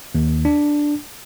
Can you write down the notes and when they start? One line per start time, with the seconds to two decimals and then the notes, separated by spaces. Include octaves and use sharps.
0.15 D#2
0.45 D4